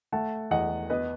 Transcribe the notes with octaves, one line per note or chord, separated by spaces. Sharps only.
A3 F#5 A5
E2 D#5 F#5
B3 B4 D#5